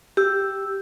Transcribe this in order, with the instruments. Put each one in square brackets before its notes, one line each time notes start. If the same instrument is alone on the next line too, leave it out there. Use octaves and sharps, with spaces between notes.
[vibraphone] G4 E6